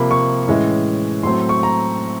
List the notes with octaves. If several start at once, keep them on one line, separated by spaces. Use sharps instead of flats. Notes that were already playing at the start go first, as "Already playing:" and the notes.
Already playing: C3 F3 A#3 B5
C#6
A2 E3 G#3 C#4
A2 F#3 A3 C4 C6
C#6
A#5